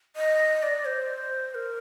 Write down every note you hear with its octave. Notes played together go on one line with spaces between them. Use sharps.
D#5
D5
C5
A#4